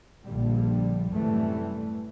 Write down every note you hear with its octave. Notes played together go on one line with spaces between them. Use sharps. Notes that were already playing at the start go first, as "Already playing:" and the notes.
A#1 A#2 D3 G3
F#2 A2 C3 E3 G3 A3